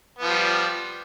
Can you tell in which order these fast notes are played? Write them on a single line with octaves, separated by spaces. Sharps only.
B3 F3 G3